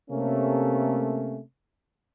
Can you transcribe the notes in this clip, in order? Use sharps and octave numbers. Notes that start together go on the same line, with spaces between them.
C3 A3 A#3 C#4